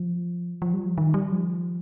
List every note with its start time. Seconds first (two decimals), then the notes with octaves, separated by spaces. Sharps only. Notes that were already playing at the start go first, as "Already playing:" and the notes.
Already playing: F3
0.62 F3
0.74 G3
0.86 F3
0.98 D#3
1.14 G3
1.32 F3